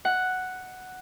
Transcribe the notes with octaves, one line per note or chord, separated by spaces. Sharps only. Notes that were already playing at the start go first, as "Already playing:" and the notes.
F#5